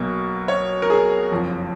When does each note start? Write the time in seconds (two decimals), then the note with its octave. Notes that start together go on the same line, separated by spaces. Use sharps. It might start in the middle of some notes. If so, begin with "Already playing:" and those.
Already playing: B1 B2 A#3
0.48 C#5
0.82 A#4
0.90 G#4
1.31 F#1 F2 F3